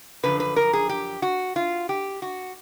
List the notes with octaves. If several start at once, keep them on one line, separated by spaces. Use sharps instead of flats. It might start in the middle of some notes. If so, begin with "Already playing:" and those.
F#2 D3 F3 B4
B4
A#4
G#4
G4
F#4
F4
G4
F#4